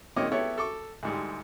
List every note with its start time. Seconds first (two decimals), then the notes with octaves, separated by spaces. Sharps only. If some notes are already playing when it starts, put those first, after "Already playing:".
0.16 A#2 D#3 C4 C#5 D#5 D6
0.32 B3 E4 G4 A4 C#5
0.58 A4 C#6 D6
1.03 D2 G#2 G3